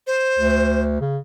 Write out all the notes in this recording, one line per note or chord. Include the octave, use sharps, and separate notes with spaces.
C5
D2
C#3